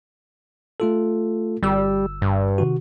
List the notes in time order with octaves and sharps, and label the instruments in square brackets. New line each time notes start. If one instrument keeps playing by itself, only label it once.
[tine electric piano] A3 F4 A4
[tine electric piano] G1 E6 [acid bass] G3
[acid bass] G2
[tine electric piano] C3 D#3 F#4